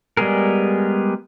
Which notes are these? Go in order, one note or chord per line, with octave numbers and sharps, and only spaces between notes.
G3 G#3 B3 G#4 A#4